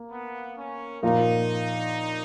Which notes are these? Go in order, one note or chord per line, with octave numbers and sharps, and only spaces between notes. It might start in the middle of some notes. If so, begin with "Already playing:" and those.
Already playing: A#3
B3
C#4
A#2 F3 A#3 D#4 F4 A#4